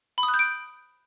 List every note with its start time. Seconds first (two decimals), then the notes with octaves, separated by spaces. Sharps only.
0.18 B5
0.23 D#6
0.28 F#6
0.34 G6
0.39 D7